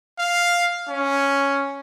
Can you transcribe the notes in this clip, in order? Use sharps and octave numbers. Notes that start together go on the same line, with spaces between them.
F5
C#4